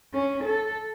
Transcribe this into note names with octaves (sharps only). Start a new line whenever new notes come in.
C#4
A4